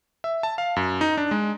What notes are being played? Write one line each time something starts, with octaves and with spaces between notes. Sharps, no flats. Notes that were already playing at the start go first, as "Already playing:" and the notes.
E5
A5
F5
F#2
D#4
D4
G#3